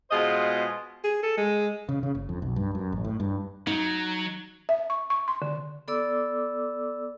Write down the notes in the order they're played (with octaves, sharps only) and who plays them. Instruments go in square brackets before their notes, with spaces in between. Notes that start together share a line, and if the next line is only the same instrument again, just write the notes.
[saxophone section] B2 G#3 F4 G#4 C5 D#5
[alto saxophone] G#4
A4
G#3
[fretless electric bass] C#3
C#3
F#1
F2
B1
G2
F#2
A1
A2
G2
[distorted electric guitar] F#3 [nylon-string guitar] D#4
[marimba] E5
C#6
C#6
C6
D3
[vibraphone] B3 A4 D5 D6 E6